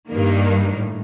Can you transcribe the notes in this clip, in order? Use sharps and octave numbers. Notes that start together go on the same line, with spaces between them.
G2 D#3 G3 A#3
A2